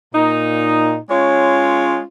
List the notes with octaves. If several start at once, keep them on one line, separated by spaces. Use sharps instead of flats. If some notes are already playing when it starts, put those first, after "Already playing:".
A#2 D#4
G#3 C#4 F4 C#5